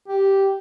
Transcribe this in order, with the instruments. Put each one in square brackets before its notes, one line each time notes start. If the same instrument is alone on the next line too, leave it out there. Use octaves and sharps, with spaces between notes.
[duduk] G4